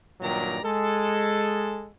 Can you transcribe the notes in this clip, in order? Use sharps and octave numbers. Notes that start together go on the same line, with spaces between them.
G2 A#2 D#3 F#3 D5 A#5
G#3 A4